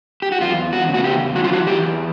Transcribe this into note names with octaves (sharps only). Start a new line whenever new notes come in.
G4
F#4
E2 F4
F#4
C#3
F#4
G4
E3 F#4
F4
F#4
G4
E2